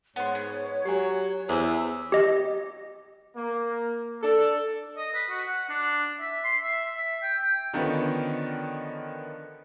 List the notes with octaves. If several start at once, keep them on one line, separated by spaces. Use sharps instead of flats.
G#2 B3 C#5 C6
B3
F#3 G4 G#5
E2 C5 E5
G4 D#5
A#3
D4 A4
D#5
B4
F#4
F#5
D4
E5
C6
E5
E5
G5
G5
D3 D#3 F3 B3 C#4